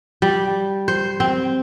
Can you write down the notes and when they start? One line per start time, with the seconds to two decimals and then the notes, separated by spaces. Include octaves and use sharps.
0.22 G3
0.88 C5
1.20 C4